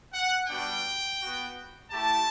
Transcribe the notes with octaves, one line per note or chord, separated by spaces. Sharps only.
F#5
G3 B3 D4 F#4 G5
B3 F#4
A3 E4 G4 A5